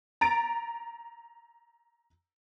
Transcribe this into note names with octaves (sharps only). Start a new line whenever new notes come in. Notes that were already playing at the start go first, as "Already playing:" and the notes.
A#5 A6 D7